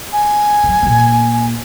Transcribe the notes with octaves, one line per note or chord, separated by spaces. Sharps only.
G#5
D3 F#3
A#2 A#3